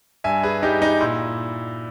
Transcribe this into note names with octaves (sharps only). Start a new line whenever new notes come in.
G2 E5 G#5
G#4 B4
G3 D#4 G4
D#4
A#2 E4